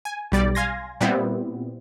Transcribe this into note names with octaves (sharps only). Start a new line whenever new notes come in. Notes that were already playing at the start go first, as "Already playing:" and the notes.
G#5
B1 G3 D5
F5 G#5 C6 G#6 A#6
A#2 G3 B3 C4 E4